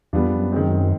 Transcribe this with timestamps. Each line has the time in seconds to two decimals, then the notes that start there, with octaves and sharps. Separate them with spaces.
0.13 E2 G3 B3 D4 F4
0.26 F2
0.39 F#2
0.52 D#3 G#3 C4